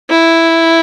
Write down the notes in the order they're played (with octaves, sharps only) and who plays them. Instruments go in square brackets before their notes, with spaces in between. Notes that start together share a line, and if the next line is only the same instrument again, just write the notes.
[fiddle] E4